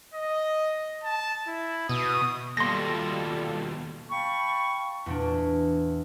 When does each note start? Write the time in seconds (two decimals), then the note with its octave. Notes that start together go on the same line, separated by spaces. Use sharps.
0.14 D#5
1.04 A5
1.47 E4
1.89 B2 D#6
2.57 D#2 B2 G3 F4 A4 C6 A#6
4.11 F5 G5 A5 B5 C#6
5.06 E2 A#2 D4